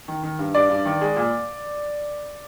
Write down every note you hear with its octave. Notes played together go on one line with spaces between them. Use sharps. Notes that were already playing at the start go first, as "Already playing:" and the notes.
D#3
D#3
G2
G2 D5
G2
D#3
G#3
A#2